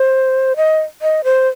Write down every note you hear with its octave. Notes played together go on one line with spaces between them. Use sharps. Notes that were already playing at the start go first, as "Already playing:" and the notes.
Already playing: C5
D#5
D#5
C5